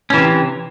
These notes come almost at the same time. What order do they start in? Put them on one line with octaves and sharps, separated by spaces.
C#4 E3 C3